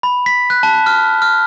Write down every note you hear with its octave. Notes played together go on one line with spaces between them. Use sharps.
B5
B6
F#6
A5
F6
F6